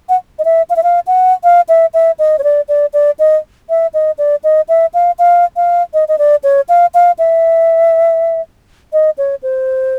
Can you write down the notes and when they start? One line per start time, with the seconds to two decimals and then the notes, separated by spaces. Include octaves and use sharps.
0.09 F#5
0.39 D#5
0.45 E5
0.70 F5
0.76 E5
0.83 F5
1.07 F#5
1.44 F5
1.69 E5
1.94 E5
2.19 D#5
2.39 C#5
2.44 D5
2.69 D5
2.93 D5
3.19 D#5
3.69 E5
3.94 D#5
4.18 D5
4.44 D#5
4.69 E5
4.94 F5
5.19 F5
5.56 F5
5.94 D#5
6.08 D#5
6.18 D5
6.44 C#5
6.69 F5
6.94 F5
7.19 E5
8.93 D#5
9.18 C#5
9.43 C5